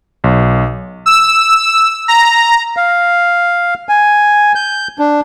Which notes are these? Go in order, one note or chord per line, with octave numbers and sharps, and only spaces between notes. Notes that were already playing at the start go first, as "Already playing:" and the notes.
B1
E6
A#5
F5
G#5
G6
D4